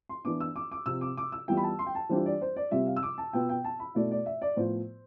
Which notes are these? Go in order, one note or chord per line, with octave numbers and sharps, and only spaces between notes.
C6
E3 B3 D4 D6
E6
D6
D6
C3 F3 C4 E6
D6
D6
E6
E3 G3 B3 F4 G5
B5
A5
C6
G5
A5
E3 G3 D4 F4 C5
D5
C5
D5
C3 G3 C4 F4 E5
F5
E6
D6
A5
B2 B3 F4 G5
G5
A5
B5
B2 A3 E4 D5
D5
E5
D5
A2 F3 B3 C5